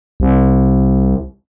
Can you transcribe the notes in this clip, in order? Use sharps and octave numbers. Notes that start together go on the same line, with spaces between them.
C2